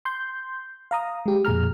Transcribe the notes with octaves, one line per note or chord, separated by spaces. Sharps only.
C6 G6
F5 A#5 D#6
G#3 G4
F2 A#2 G#4 A#5 F6